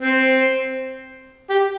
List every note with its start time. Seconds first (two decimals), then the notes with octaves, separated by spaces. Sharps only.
0.01 C4
1.50 G4